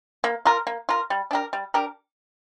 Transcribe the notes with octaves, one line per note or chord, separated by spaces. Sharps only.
A#3
F4 A#4
A#3
F4 A#4
G3
D4 G4 A#4
G3
D4 G4 A#4